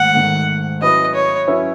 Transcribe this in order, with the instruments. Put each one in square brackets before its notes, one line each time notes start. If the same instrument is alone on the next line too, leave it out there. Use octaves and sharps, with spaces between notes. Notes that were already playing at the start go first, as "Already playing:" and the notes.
Already playing: [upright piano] G#2 D#3 A3 [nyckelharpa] F#5
[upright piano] G#2 D#3 A3
[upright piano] F#3 C#4 E4 B4 [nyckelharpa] D#5
[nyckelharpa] C#5
[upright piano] F#3 C#4 E4 B4